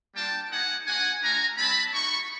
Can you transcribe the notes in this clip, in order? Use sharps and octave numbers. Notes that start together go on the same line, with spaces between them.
G3 A#3 D4 F4 G5 A5
A#3 D#4 G4 F#5 G#5
A#3 D4 F#4 F#5 G#5
A3 D4 F4 G#5 A#5
G3 C4 E4 A5 B5
A#3 D#4 F#4 B5 C#6